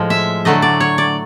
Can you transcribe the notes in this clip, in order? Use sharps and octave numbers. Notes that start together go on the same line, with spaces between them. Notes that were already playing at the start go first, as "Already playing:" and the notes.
Already playing: A2 F3 G#3
E5
D3 F#3 A3 D#5
D5
C#5
D5